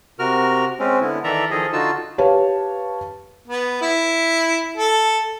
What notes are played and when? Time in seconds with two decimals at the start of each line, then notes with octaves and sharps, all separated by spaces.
0.19 C3 F#4 A#4 F6
0.79 G#3 C4 C#4
1.01 D3 B3 E4
1.24 D#3 E3 A4 D5 E5 A#5
1.51 D#3 F3 G#4 A4 D#5
1.73 D3 D#4 F4 F#4 A5 E6
2.18 G4 B4 C#5 F5 A5
3.48 B3
3.81 E4
4.77 A4